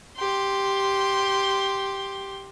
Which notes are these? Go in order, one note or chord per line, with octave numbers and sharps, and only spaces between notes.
G4 C6